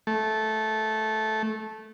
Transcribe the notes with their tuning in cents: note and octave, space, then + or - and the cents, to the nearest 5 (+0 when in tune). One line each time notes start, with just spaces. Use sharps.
A3 -15